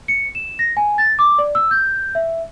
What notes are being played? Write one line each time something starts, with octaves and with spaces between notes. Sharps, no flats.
C#7
E7
A#6
G#5
A6
D6
D5
E6
G6
E5